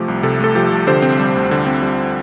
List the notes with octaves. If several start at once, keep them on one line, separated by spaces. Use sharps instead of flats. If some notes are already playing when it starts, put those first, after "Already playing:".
Already playing: C3 F3 A3 G4
C2
C3 A4
A3 A4
F3 G4
C2
D3 G4 C5
C4
G3
D2
D3
C4
G3